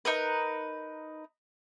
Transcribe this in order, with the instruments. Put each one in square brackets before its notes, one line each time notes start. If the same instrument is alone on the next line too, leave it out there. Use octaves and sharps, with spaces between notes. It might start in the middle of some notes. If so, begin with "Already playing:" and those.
[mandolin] D#4 A#4 B4